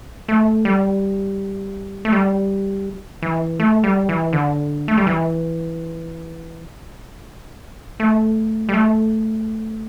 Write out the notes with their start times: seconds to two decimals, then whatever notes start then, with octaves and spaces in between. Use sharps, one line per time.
0.28 A3
0.65 G3
2.05 A3
2.12 G3
3.22 E3
3.60 A3
3.84 G3
4.09 E3
4.33 D3
4.88 A3
4.97 G3
5.07 E3
8.00 A3
8.69 G3
8.74 A3